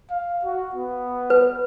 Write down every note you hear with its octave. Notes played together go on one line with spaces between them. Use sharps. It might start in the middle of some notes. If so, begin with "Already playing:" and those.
F5
F#4
B3
B4